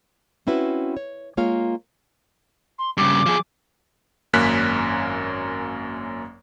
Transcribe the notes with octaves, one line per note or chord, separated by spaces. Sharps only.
C4 C#4 E4 F#4 B4
C#5
G#3 A#3 F4 C#5 F5
C6
G2 C#3 D6
F3 G#4
G#1 F#2 A#3 C#4 F#6 B6